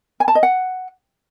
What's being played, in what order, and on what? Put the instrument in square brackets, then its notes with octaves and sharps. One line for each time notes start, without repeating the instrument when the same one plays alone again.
[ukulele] G#5
A5
D#5
F#5